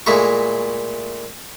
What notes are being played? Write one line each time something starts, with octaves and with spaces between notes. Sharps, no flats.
A#2 G#3 A3 E4 A#5 C#6